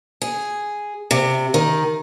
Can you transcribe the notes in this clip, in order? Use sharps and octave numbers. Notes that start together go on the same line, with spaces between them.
G#4
C3
D#3